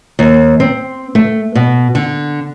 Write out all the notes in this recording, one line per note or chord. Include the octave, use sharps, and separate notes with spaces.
D#2
C4
A3
B2
D3